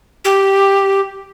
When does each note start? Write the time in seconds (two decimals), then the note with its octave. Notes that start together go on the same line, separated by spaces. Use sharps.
0.25 G4